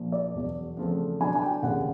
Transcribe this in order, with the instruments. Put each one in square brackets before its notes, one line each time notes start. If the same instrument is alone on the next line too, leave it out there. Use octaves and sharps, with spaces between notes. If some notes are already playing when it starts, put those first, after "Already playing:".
Already playing: [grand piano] A#1 A#2 F3
[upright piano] D5
[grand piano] E1 E2 B2 F#3
E2 C#3 F3 A3 C4
[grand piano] B2 F#3 B3 D4 [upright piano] G#5
[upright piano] G#5
G5
[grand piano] F1 D#2 C#3 [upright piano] F#5